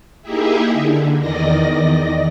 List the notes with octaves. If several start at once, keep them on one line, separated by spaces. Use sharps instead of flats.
A#3 D#4 E4 G4 G#4 E5
D3
E2 D#3 D5 D#5 A#6